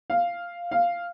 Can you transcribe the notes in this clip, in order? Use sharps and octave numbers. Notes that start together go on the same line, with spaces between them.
F5
F5